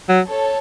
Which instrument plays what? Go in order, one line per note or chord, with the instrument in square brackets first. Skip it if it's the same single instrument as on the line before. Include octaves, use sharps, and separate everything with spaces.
[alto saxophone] F#3
[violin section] A4 C#5